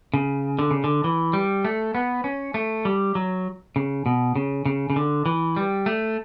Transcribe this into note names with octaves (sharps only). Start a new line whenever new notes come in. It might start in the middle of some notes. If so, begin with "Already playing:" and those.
C#3
D3
C#3
D3
E3
G3
A3
B3
C#4
A3
G3
F#3
C#3
B2
C#3
C#3
C#3
D3
E3
G3
A3